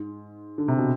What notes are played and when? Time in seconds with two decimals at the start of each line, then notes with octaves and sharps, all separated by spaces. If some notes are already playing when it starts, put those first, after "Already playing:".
Already playing: G#2
0.58 D3
0.68 C3
0.78 B2